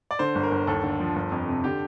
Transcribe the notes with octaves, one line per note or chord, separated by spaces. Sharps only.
D5
D3 C5
G1
A#4
G1
D#2 A4
D3
F3
G1
F2
C3
D3 G4